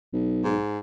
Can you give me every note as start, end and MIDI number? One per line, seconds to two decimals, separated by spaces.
0.13 0.55 35
0.44 0.78 44